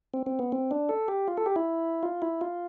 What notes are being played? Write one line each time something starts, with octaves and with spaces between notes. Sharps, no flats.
C4
C4
B3
C4
D4
A4
G4
F4
A4
G4
E4
F4
E4
F4